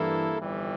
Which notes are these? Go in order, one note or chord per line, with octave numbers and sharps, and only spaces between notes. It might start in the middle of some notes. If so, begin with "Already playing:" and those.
Already playing: G2 E3 A#3 E4 A4
G1 F2 E3 G3